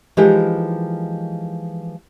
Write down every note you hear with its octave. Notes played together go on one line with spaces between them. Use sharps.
E3 F3 G#3 D#4 G4 A#4